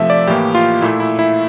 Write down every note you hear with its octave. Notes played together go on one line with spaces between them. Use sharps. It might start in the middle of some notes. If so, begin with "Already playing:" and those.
Already playing: C3 F3 A3 E5
D5
A2 E3 A#3 G4
F4
A#2 A3 E4
E4
E4